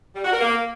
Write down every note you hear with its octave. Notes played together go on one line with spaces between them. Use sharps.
G3
F#4
A#4
A#3